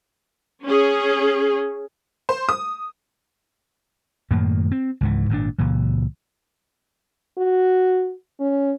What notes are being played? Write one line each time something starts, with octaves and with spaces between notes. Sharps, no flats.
C#4 G#4
C5
D#6
F#2 A2 D#3 A#3
C4
C#2 G#2 E3
G#1 A#2 C#3 D4
C#2 A#2 E3
F#4
C#4